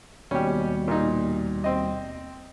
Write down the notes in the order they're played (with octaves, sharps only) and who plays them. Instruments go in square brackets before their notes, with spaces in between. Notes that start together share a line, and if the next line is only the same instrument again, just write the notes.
[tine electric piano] D#2 B2 G3 [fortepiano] C#4 G4
[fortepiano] A#2 D#4
C4 D#5